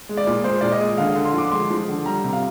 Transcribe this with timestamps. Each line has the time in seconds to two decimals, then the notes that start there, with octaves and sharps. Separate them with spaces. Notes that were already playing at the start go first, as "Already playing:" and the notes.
0.09 G#3
0.17 D5
0.27 A#2
0.44 G#3 C5
0.61 A#2 D5
0.72 D#5
0.80 G#3
0.98 D3 F5
1.12 D3 F5
1.25 C6
1.33 F3 D6
1.52 G#3 C6
1.70 F3
1.88 D3
2.06 G3 A#5
2.24 C3
2.33 F5